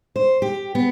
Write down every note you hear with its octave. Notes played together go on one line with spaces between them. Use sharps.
C5
G4
B3